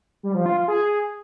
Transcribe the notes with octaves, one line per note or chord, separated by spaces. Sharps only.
G3
F3
F4
F4
G#4